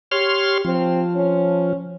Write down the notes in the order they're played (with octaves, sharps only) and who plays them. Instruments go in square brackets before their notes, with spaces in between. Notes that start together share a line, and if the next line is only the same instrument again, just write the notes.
[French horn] G4 [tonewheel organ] C#5 C6 F6
[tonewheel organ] F3 [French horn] C4
[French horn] C#4